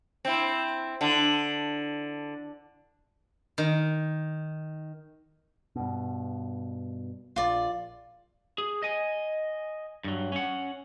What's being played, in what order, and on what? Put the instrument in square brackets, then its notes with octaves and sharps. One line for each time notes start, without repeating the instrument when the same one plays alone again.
[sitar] C4 E4
D3
[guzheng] D#3
[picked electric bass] G2 B2
[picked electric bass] A#1 [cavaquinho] F4 D5
[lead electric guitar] G#4
D#5 G#5
G2 F#3
C#4 F#5